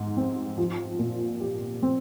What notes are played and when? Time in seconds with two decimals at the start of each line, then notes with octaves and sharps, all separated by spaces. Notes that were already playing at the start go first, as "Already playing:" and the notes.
Already playing: G#2
0.17 C4
0.58 F3
0.99 A#2
1.40 G4
1.82 C4